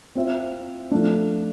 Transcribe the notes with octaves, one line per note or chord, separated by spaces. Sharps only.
C4 F4 C5 E5
F3 A3 D4